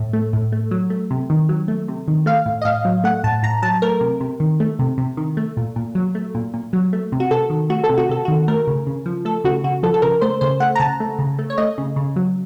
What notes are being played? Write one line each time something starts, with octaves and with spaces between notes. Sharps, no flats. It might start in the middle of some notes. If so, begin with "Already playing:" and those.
Already playing: A2 A3
A3
A2
A3
F#3
A3
C3
D#3
F#3
A3
C3
D#3
A3 F5
A2
D#5
A2 F5
F#3
A3 F#5
A2 A5
A2 A#5
F#3 A5
A3 A#4
C3
C3
D#3
A3
C3
C3
D#3
A3
A#2
A#2
F#3
A3
A#2
A#2
F#3
A3
C3
F#4
C3 A4
D#3
A3 F#4
A4
C3
F#4
C3 A4
D#3 F#4
A3 A#4
C#3
C#3
F3
A3 A4
C#3 F#4
C#3 F#4
F3 A4
A4
C#3 A#4
A3 C5
C#3 C5
A3 F#5
A#5
C#3 A5
A3
C#3
A3
C#5
A3 D#5
C#3
C#3
F#3